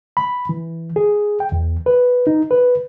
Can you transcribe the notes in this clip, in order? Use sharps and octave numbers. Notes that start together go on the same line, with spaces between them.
B5
E3
G#4
G5
E2
B4
D#4
B4